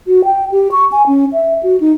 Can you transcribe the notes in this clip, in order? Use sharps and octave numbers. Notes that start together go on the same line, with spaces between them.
F#4
G5
G4
C#6
G#5
C#4
E5
F#4
D#4